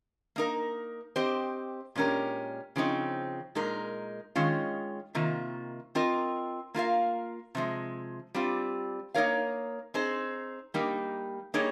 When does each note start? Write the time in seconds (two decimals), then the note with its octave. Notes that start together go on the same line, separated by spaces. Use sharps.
0.36 A#3 D#4 A#4
1.16 C4 G4 C5 D#5
1.95 A#2 G#3 C#4 G4 A#4
2.76 C#3 F3 C4 D#4
3.55 A#2 G#3 D#4 A#4
4.36 D#3 G#3 C#4 F4
5.15 C3 D#3 A#3 F4
5.95 C4 F4 A#4 D#5
6.74 A#3 F4 A#4 F5
7.55 C3 F3 G#3
8.34 G3 C4 F4
9.14 A#3 D#4 A#4 C#5 F5
9.94 C4 D#4 G#4 C5
10.74 G3 A#3 D#4
11.54 G3 A#3 D#4 G#4 C#5